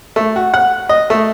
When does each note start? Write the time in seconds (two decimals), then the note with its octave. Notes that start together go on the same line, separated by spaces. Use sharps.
0.16 A3
0.36 F#4
0.54 F#5
0.89 D#5
1.10 A3